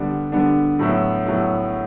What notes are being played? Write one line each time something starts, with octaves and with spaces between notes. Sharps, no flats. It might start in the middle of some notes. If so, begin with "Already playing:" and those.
Already playing: D3 G3 B3 D4
D3 G3 B3 D4
A2 F#3 B3 E4
A2 F#3 B3 E4